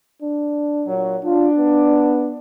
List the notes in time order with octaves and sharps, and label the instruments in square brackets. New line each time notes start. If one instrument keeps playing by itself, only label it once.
[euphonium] D4
[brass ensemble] A#2 F#3
[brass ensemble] D4 [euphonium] F4
[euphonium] B3